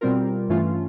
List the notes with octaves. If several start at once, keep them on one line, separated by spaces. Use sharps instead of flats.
B2 G3 C4 F4 A#4
G2 E3 A3 C#4 F4